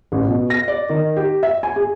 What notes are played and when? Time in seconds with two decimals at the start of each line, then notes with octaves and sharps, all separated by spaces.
0.12 A1
0.28 B2
0.50 A#6
0.68 D5
0.89 D#3
1.16 G4
1.43 E5
1.63 G#5
1.76 G#4